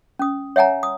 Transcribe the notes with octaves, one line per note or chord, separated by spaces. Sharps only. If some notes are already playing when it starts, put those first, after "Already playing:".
C#4 D#6
C#5 E5 F#5 G#5 A#5
D#6